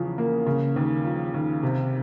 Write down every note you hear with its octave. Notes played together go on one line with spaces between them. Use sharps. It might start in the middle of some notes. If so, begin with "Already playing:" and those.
Already playing: E2 C#3 F3
A#3
C#3
D#2
F3
D#2
C3